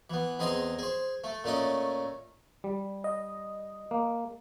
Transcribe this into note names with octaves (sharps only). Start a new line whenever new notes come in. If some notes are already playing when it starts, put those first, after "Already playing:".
E3 B3
E2 C4 G#4 D#5 A#5 C6
G#4 C5
A3
A#2 A3 C#4 D#5
G3
D#5
A#3